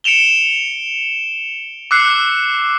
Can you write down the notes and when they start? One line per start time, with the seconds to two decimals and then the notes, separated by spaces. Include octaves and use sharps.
0.04 C#7 D7 E7 F7 G7
1.91 D6 E6 F#6 C7 C#7